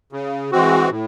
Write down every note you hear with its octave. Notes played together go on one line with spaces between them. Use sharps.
C#3
E3 G#3 C4 F#4
A2